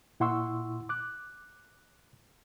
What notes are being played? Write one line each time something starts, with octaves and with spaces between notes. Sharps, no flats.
A#2 E4 F#5 C6 C#6 E6
D6 F#6